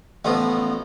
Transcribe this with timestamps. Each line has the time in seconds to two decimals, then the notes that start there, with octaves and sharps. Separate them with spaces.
0.25 A1 A2 F3 B3